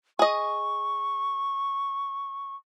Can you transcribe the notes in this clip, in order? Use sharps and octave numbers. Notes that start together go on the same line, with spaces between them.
G#4 D#5 C#6